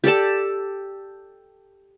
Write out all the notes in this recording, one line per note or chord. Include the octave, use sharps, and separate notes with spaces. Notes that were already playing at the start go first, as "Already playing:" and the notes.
G4 A4 D5 A5